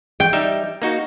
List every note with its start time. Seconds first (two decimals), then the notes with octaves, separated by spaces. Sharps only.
0.20 G5
0.33 G3 D#4 E5
0.82 A#3 D#4 F#4